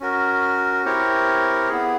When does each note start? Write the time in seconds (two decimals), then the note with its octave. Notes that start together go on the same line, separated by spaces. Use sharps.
0.01 C#4 F#4 A#4
0.85 C4 E4 G4 A#4 C#5
1.69 B3 E4 G#4